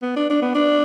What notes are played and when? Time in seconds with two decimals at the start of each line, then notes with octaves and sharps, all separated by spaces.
0.02 B3
0.16 D4
0.30 D4
0.42 B3
0.55 D4